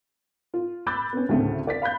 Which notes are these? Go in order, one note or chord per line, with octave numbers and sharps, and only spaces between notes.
F4
B5 D6 E6 F#6 G6 A6
B3 C#4
D2 A2 C#3 A3 C4
D5 A6 B6
F5 B5 F#6 G6